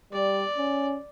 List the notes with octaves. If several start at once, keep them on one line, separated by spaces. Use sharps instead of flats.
G3 D5
C#4